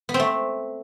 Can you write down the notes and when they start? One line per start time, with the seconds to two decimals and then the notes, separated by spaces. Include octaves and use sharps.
0.09 B3
0.14 C4
0.20 A3